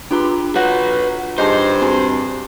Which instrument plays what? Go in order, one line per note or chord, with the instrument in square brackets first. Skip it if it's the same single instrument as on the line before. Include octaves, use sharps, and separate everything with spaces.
[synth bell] D4 F4 A#5 [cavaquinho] G4 B4 C6
[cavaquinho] F#4 [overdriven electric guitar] B4 C#5
[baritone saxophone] G2 [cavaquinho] D#4 G#4 A5 [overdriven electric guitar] C5
[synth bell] C4 [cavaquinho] G#4